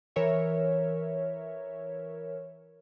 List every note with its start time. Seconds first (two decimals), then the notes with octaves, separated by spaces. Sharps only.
0.16 E3 A#4 C#5 E5